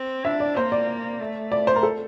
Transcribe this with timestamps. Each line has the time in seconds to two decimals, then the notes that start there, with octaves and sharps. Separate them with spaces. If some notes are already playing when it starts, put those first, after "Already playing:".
Already playing: C4
0.25 D4 E5
0.40 D5
0.56 A#3 C5
0.72 D5
1.21 A3
1.52 D5
1.67 C5
1.76 A#4
1.83 A4